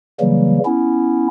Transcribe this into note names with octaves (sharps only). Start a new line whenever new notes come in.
C#3 E3 F#3 G3 A#3
B3 C#4 E4